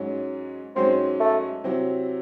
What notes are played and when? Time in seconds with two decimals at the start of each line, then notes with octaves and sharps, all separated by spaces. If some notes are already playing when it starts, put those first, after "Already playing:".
Already playing: G#2 F#3 C#4
0.76 G#2 F#3 C4 C#4
1.20 A3
1.64 C3 F#3 C4 E4